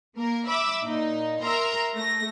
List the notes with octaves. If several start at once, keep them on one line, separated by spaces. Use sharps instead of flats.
A#3 A#4
E5 B5 D6 E6
A#2 D#4
A#4 E5 A#5 C6
A3 A#6